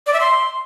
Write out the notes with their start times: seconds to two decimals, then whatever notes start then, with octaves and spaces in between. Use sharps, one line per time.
0.07 D5
0.13 E5
0.20 C6